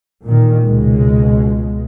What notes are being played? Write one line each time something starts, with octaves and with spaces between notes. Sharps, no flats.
A#2 D#3
C#2 B2 G#3